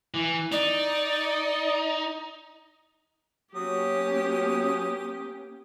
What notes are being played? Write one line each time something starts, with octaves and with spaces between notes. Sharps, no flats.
E3
D#4 D5
F#3 A#3 B3 C#4 G4 D#6